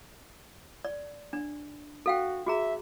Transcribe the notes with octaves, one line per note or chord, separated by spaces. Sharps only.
D5
D4
F#4 A4 F5 G5
F#4 G#4 E5 A#5